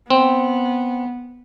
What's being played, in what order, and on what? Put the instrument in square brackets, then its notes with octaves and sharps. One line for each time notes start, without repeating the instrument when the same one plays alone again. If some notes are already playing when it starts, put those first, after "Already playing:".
[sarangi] B3 [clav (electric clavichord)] C4